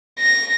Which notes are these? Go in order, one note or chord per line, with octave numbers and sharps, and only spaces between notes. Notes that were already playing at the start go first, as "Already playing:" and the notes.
A#6